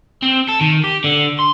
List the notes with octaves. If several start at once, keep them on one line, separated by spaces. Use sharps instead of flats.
C4
A4
D#3
G4
D3
C6